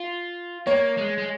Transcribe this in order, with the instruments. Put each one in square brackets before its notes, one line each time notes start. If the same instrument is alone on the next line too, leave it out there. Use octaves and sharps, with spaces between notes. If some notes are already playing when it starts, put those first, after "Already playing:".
Already playing: [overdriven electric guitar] F4
[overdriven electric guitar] A#3 [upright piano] C#5
[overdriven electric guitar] G#3
G#3